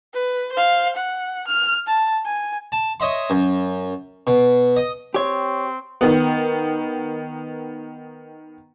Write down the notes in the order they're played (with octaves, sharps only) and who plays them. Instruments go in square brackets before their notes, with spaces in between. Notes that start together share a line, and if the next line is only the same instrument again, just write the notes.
[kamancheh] B4
C5 F5
F#5
F6
A5
G#5
[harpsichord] A5
C#5 D#5 E5 C6
F#2
B2
D#5
[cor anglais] C4 [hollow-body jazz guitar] G4 C#5
[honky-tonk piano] D#3 B3